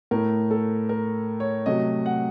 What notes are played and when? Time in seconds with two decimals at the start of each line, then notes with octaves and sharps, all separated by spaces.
0.11 A2 A3 A#4
0.51 A4
0.89 A#4
1.40 C#5
1.66 C3 F#3 A3 D#5
2.06 F#5